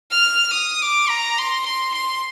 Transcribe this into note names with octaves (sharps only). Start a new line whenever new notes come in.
F6
D#6
D6
A#5
C6
C6
C6